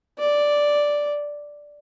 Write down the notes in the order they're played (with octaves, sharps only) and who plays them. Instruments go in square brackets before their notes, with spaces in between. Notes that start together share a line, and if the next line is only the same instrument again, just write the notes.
[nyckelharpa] D5